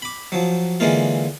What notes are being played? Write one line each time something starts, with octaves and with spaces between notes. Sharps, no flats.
B5 D6
F3 F#3
D3 E3 G#3 A#3 F4